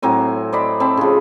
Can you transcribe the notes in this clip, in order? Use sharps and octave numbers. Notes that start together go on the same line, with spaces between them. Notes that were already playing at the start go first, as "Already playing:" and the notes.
A2 F#3 C4 G#5
C5 D5 D#5 B5
C4 A5 B5
C#3 F3